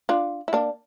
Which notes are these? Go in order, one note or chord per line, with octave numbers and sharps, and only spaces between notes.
D4 F4
E4
A#3 D4